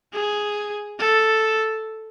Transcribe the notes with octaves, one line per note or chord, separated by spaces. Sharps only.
G#4
A4